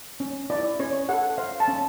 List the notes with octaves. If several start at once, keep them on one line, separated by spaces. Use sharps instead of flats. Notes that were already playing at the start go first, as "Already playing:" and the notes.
C#4
E4 D5
C#4 C#5
A4 F#5
C5 F5
A5
C#4